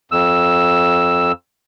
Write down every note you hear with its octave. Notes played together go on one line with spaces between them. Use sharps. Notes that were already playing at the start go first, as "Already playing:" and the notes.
F2 E6